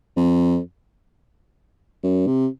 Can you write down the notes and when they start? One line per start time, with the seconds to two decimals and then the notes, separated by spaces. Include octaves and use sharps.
0.17 F2
2.03 F#2
2.27 C3